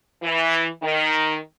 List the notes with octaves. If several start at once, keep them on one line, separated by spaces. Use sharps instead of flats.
E3
D#3